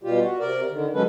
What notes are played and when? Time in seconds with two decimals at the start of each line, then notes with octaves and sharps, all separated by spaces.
0.03 B2 G3 F4 G4
0.21 F#4
0.39 C3 A#4 D5
0.70 D3 D#3
0.94 C#3 F#3 G#3 C#4 A4 B4